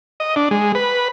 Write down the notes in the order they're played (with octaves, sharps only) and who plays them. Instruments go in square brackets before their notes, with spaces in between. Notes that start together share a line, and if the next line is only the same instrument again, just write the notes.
[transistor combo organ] D#5
D4
G#3
B4